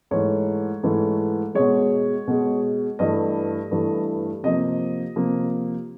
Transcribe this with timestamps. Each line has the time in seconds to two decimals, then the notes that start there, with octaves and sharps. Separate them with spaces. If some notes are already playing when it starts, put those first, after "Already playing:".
0.11 G#2 E3 A3 C#5
0.83 G#2 E3 A3
1.55 B2 G#3 C#5
2.27 B2 G#3
2.99 G2 E3 A3 D#5
3.71 G2 E3 A3
4.43 C3 F3 A#3 D#5
5.16 C3 F3 A#3